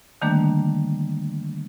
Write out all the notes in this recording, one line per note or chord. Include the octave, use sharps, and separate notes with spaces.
D3 D#3 G3 A3 A#3 D4